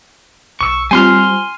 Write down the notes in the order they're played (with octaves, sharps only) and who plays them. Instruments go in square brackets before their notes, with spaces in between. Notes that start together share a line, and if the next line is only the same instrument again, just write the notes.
[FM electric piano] B1 E6 [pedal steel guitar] C#6
[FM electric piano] G3 C4 F4 [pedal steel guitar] G#5 C6 F6